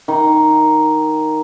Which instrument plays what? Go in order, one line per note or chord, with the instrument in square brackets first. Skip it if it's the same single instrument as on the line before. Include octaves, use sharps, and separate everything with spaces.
[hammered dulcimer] D#3